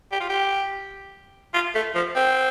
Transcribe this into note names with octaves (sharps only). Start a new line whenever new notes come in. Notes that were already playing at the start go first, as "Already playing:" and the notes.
G4
F4
G4
F4
A3
F3
C4